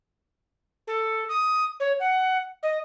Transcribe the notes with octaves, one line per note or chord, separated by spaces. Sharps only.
A4
D#6
C#5
F#5
D#5